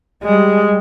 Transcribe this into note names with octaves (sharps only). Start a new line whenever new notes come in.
G3 G#3